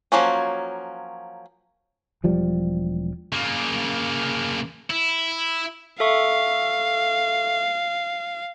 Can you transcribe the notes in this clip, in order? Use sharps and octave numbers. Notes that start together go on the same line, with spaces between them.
F3 F#3 A#3 C#4
E1 F3 G3
C#3 A#3
E4
A4 E5 F5 C#6